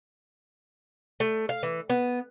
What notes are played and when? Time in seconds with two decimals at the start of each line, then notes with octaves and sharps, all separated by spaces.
1.20 A3
1.49 F5
1.63 E3
1.90 B3